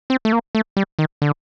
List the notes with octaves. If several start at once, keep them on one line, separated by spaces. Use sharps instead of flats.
C4
A3
A#3
A3
G3
D#3
D3